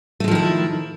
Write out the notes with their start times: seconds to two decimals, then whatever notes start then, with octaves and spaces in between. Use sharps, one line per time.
0.20 A3
0.24 G#3
0.28 F3
0.31 D#3
0.35 E4